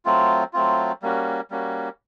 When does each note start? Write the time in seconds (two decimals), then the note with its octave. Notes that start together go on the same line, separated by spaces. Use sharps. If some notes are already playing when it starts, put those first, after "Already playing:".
0.05 F#3 A3 C4 F4
0.53 F#3 A3 C4 F4
1.02 G3 A#3 C#4 F#4
1.50 G3 A#3 C#4 F#4